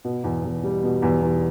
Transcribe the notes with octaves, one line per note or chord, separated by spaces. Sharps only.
B2
E2
E2
G3
B2
E2
E2